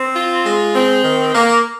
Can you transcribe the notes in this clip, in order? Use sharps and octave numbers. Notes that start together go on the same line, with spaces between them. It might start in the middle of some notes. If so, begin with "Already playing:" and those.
Already playing: C4
F4
G#3
C4
D#3
A#3